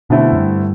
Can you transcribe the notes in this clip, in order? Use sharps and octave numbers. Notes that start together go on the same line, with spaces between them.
B2 D3 A3 C4 E4
F#2
G2